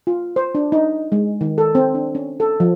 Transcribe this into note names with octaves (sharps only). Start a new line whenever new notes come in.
F4
C5
D4
D#4
G#3
D#3
A4
C4
D4
C#4
A4
F3